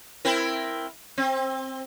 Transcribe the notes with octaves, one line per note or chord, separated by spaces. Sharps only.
C4 E4 A#4
C4